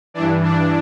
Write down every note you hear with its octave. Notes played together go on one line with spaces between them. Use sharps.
G2 E3 D4
D4